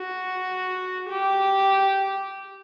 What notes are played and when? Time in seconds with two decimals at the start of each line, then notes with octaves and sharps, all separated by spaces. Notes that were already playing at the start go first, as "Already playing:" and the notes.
Already playing: F#4
1.10 G4